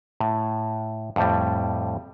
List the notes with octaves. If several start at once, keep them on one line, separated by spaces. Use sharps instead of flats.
A2
F2 A2 G3